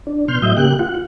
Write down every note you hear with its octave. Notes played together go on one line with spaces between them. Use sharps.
D4
B2 C6 F6 G6
A2 F#3 D#5 E5 G6
C#3 A#3 G4 G5 F#6
F4 F#5